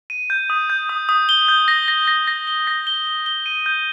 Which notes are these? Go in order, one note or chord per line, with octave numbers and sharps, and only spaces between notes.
D#7
G6
D#6
G6
D#6
D#6
G7
G6
A#6
A#6
A#6
A#6
G7
A#6
G7
G7
G7
D#7
G6